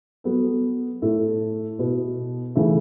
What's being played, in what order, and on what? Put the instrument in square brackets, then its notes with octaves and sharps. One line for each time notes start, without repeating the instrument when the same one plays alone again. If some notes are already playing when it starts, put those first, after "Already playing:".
[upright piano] F#3 B3 A4
A2 A3 E4 A4
B2 B3 E4
C#3 E3 A3 E4 A4